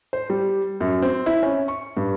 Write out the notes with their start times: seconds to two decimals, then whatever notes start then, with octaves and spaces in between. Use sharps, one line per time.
0.13 C5
0.30 G3
0.81 F#2
1.02 C4
1.26 E4
1.43 C#4
1.68 C#6
1.97 G2